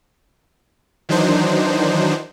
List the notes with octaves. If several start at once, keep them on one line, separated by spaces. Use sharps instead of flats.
D#3 E3 F#3 D4 D#4 C5